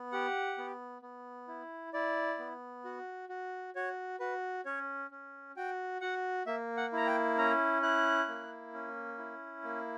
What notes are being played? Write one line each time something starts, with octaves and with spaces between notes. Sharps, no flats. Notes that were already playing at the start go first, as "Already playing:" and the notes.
Already playing: B3
G4 F#5
B3
B3
E4
E4 D5
B3
F#4
F#4
F#4 C#5
F#4 B4
C#4 C#5
C#4
F#4 G5
F#4 F#5
A#3 E5
F#5
E4 A#5
G5
C#4 A#5
E4 F#6
A#3
C#4
E4
A#3